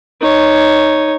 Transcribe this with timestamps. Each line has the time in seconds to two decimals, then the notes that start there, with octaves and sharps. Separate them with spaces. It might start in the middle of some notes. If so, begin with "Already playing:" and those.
0.22 D#4 C#5